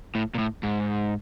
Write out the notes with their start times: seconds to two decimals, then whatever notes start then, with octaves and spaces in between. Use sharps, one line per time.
0.15 A2
0.35 A#2
0.39 A2
0.63 G#2